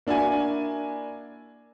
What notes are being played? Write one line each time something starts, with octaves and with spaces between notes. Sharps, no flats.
A#3 D4 E4 F#4 G#5